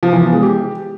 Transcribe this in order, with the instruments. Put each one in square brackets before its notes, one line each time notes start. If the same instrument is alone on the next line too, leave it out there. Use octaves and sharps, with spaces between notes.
[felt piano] F3
E3
B3
G#3
G4